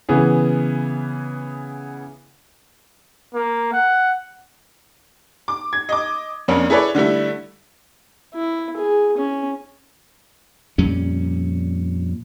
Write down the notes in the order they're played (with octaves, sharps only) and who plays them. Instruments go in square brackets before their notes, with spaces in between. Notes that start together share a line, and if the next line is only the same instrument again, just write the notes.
[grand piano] C#3 E3 B3 G#4
[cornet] A#3
F#5
[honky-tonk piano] D6
G#6
D#5 D6
F2 A#3 C#4 D4
E4 G#4 A4 B4 C#5 D5
D3 G3 A3 E4
[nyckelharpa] E4
G#4
C#4
[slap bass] F2 A#2 G3 C#4